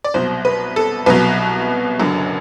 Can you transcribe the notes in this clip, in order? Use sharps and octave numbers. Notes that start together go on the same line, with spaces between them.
D5
C2 B2 F#3 C5
B4
A4
C2 B2 F#3 B4
F#1 F#2 D3 F#3